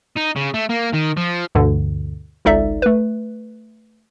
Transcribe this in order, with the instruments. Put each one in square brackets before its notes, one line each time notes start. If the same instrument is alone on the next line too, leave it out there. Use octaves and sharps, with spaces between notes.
[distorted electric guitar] D#4
C#3
A3
A#3
D#3
F3
[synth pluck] D2 G2 B2 D3
G#1 C#2 D#4 A4 D5 E5
A3 B4